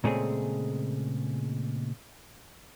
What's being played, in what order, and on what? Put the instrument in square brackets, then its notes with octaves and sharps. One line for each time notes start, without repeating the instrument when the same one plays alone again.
[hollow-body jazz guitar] A#2 C#3 G#3 A3 C4 G#4